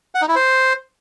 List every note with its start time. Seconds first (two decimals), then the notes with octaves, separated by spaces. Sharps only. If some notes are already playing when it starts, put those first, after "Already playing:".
0.15 F#5
0.22 D#4
0.28 E4
0.35 C5